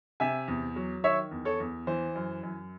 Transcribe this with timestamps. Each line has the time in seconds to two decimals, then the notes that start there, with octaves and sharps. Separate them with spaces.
0.20 C3 E5 G#5
0.48 E2
0.76 F#3
1.04 D#3 C#5 E5
1.31 E2
1.45 A4 C#5
1.60 E2
1.87 E3 C5
2.15 F#2
2.43 F#2